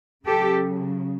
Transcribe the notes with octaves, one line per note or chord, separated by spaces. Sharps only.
C#3 F#3 G4 A4